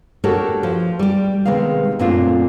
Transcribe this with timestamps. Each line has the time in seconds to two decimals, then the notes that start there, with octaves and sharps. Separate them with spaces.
0.24 D4 F#4 G4 A4 A#4 C#5
0.63 F3
0.99 G3 G4
1.45 C3 D#3 G#3 B3 F5
1.99 F#2 A#2 A3 C4 D4 F4